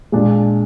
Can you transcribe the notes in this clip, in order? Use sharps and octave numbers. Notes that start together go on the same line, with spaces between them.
A#2 G#3 D4 F4